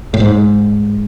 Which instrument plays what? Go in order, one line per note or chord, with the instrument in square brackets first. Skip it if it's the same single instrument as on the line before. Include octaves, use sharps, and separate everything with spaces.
[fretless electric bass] A2
G#2